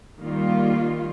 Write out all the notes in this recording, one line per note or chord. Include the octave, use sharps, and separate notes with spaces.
D#3 G3 A#3 F4